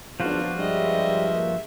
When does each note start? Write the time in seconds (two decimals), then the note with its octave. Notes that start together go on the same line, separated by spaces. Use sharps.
0.20 G#1 C#2 F3 F#3 B3 D4 F4 F#4
0.58 G2 G3 G#3 D#5 E5
1.34 A#3